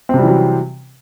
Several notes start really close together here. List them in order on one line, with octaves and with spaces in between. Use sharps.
C4 C3 G3 E3 F#3